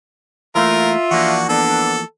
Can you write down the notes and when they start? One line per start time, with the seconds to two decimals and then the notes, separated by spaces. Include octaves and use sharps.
0.55 E3 A3 A#3 F4 A#4 E5
1.11 E3 F3 A#3 D4 F#4
1.49 B3 D4 A4